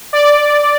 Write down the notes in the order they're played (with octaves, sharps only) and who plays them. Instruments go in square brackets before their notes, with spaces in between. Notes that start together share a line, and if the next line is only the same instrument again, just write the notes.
[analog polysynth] D5